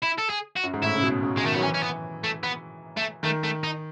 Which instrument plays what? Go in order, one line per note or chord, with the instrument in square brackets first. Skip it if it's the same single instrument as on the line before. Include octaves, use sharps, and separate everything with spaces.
[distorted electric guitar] E4
A4
G#4
F#4
[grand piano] F#2
G#2
[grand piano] A2 [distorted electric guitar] E4
[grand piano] C#3
B2
C#3
[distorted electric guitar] G#3
[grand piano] D#3 [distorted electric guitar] A3
[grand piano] F#3 [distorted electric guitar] B3
[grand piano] E3 [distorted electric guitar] C#4
[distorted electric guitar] C#4
B3
A3
B3
A3
[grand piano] D#3 [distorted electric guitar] A3
[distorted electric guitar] A3
D#4